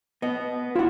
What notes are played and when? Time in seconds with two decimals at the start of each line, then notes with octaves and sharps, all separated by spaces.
0.22 B3 D#5
0.76 E4 F4 F#5